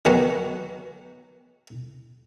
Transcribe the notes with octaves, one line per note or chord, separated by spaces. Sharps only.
D#3 F#3 B3 F#4 F#5